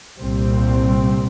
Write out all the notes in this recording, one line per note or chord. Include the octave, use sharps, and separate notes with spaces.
C2 A#2 G3 C4